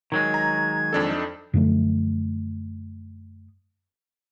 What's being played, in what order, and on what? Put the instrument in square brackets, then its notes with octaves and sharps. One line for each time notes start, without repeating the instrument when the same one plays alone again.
[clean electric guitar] D#3 F#3 G#3 [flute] G#6
[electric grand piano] A#5
F2 D4 A4
[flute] D#4
[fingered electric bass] F#2 D3 F3 A3